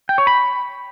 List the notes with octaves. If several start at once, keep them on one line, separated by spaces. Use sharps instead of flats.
G5
C#5
B5